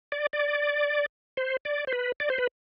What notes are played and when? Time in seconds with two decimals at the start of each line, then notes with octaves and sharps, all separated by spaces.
0.12 D5
0.33 D5
1.37 C5
1.65 D5
1.87 C5
1.93 B4
2.20 D5
2.30 C5
2.38 B4